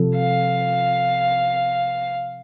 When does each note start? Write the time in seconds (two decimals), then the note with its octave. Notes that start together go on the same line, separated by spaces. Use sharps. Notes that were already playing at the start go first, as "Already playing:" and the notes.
Already playing: C3 F3 C4 F4 A4
0.17 F5